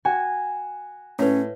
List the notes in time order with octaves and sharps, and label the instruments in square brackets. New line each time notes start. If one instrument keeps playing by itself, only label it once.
[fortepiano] F#4 [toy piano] G5 [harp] G#5
[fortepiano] A2 [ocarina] C#4 [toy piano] B4 C#5